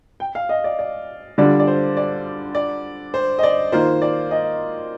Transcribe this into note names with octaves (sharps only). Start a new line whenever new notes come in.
G5
F5
D#5
D5
D5
D3 G3 D4 F4 D5
D5
C5
D5
D5
C5
D#5
D5
D#3 A#3 F4 C5
D5
D#5